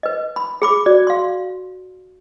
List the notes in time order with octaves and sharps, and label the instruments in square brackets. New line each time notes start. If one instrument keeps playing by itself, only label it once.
[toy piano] B4 D#5
B5
G#4 B5 D6
[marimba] F#4 [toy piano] D5
[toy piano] F5 C6